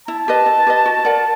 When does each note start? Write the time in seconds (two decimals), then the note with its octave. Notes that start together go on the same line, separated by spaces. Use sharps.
0.08 E4 A5
0.28 G4 B4 D#5
0.46 E4
0.67 G4 B4 D#5
0.86 F#4
1.05 A#4 D5 F#5